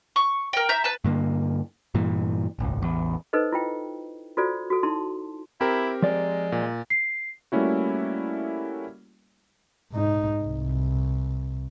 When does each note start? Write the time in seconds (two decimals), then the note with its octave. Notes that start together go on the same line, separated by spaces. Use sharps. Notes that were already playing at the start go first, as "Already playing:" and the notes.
0.16 C#6
0.53 A#4 G5
0.69 E5 A#5 G6
0.84 B4 A5
1.04 G2 D3 A#3
1.95 G2 A#2 E3
2.59 D#1 G#1 C#2
2.82 A1 E2
3.33 D#4 A4 B4 C5 D#5
3.53 E4 F4 G5
4.37 F4 F#4 A4 C5 D5
4.70 F#4 A4
4.83 D#4 E4 A5 C6
5.61 C4 E4 G4 A#4
6.02 F3 G#3 D5
6.52 A#2
6.90 C7
7.52 G3 A3 A#3 C#4 E4 F#4
9.92 G#2 D#4
10.44 C2